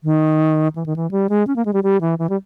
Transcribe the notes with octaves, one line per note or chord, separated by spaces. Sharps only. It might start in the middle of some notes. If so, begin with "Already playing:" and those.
D#3
E3
D#3
E3
G3
G#3
C#4
A#3
G#3
G3
G3
E3
E3
G3